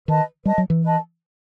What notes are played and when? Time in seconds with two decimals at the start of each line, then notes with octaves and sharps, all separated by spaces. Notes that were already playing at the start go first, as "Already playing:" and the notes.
0.08 D#3 B4 D#5 A5
0.45 G3 B4 D#5 A5
0.58 F#3
0.70 E3
0.83 B4 D#5 A5